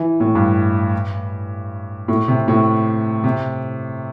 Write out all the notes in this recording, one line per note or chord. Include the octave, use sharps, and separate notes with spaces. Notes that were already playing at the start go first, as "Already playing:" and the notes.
Already playing: E3
A2
G2
A2
C3
A2
C3